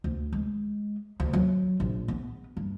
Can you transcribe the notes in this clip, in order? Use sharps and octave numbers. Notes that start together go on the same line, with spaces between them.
D2
G#3
D2
F#3
A#1
B3
G2